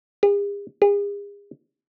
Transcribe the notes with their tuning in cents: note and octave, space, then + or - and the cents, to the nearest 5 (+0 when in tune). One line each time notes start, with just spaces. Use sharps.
G#4 -45
G#4 -40